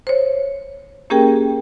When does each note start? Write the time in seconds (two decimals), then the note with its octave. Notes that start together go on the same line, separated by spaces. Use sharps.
0.07 C5 C#5
1.10 A#3 C#4 G4 G#4 A#4 G5